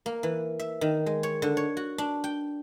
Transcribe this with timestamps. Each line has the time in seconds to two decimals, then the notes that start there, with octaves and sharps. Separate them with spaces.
0.06 A#3
0.23 E3
0.59 E5
0.81 D#3
1.06 G#3
1.23 C#5
1.42 D3
1.57 C#5
1.77 F#4
1.98 D4
2.24 G5